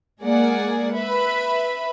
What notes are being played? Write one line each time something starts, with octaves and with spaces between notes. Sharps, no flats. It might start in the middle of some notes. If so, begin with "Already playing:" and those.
G#3 A#3 G#4 D5 F#5
B4 E5 B5